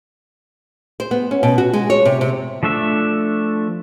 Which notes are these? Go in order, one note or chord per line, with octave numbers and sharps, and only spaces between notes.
C5
B3
C#4
B2
F#4
G#3
C#5
C3
C3
F3 A3 D4 E5